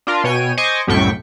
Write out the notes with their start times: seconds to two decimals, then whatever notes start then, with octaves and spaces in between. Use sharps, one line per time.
0.07 D4 F4 A#4
0.24 B2 C#5 G5 G#5 D#7
0.57 C5 D#5 G#5 C#6 D6
0.87 C2 F#2 A2 G5 C#6 B6